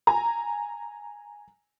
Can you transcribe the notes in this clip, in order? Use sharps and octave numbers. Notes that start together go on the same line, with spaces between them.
G#5 A#5